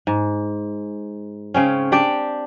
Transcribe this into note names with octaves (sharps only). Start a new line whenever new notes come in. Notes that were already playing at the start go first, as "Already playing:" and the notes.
G#2
C#3 C4 C#4
D4 G4 D5